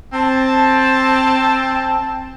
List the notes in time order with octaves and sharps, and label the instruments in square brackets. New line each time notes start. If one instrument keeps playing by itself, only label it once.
[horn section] C4 A5